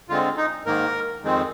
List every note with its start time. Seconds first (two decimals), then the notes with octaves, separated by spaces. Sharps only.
0.09 D3 G#3 C4 F4
0.37 D#4
0.65 G#2 D#3 A#3 A#4
1.23 F2 D#3 G#3 C4